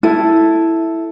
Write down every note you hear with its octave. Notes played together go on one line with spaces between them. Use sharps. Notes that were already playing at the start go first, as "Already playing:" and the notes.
E4 A4